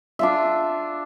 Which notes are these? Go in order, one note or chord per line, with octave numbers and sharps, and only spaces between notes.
D4 F4 E5